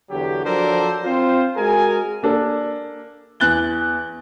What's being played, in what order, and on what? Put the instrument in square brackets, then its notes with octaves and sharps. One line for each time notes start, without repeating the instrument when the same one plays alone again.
[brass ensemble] E2 D3 F#3 G4
F3 F#3 D4 A4 A#4 C5
C4 F4 C5
G#3 F#4 G#4 A#4 G#5
[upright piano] A#3 D4 A4
E2 F#6 A6 G7